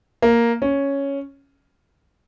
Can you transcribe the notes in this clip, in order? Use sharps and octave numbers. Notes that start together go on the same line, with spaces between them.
A#3
C#4